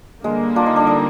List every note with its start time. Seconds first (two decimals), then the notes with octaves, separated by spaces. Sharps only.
0.24 D3 G3 G#3 A#3
0.56 D4 F4
0.66 D#4
0.76 D4
0.87 D#4